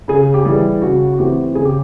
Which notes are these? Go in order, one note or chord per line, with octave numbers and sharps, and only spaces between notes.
C#3 G#4
G4
E3 G3 G#4
C#3 F#4
F#4
E3 A3 C4 G4
C#3 G#4
G4